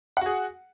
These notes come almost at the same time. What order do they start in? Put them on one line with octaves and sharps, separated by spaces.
F#5 F#4 G#4